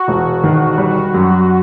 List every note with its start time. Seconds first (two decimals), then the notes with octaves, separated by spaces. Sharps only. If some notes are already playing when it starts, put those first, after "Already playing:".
Already playing: F#4
0.08 E1
0.44 D#3
0.78 G3
1.14 F#2